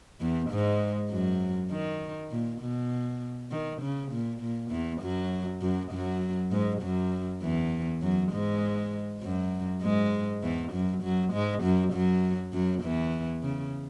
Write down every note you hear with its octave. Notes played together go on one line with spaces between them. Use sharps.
E2 E3
G#2 G#3
F#2 F#3
D#3
A#2
B2
D#3
C#3
A#2
A#2
E2 E3
F#2 F#3
F#2 F#3
F#2 F#3
G#2 G#3
F#2 F#3
E2 E3
F#2 F#3
G#2 G#3
F#2 F#3
G#2 G#3
E2 E3
F#2 F#3
F#2 F#3
G#2 G#3
F#2 F#3
F#2 F#3
F#2 F#3
E2 E3
C#3